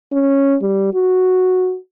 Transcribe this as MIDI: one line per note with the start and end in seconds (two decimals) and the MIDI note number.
0.12 0.56 61
0.62 0.92 55
0.94 1.77 66